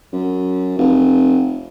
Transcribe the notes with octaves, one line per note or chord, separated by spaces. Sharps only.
F#2
F1